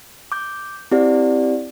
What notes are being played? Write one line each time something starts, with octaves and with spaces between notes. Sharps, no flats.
D6 G6
C4 E4 G4 D5